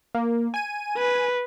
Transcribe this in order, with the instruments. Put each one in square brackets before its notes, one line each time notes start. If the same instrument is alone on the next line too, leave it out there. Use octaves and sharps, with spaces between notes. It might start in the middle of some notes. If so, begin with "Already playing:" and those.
[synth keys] A#3
G#5 D#7
[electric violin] B4